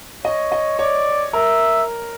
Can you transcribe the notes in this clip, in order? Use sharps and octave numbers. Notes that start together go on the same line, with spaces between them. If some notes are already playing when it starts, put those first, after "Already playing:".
C#5 D#5
D#5
C#5 D5
A#4 E5